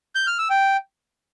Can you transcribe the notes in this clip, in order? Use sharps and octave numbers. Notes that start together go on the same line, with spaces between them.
G6
F6
E6
G5